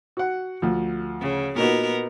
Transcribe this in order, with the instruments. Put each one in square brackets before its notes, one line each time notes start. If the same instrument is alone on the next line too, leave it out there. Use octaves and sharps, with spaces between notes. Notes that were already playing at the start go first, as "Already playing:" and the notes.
[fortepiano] F#4 F#5
D2 F3
[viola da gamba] C#3
[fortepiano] A#2 D#4 F#4 [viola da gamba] B3 A#4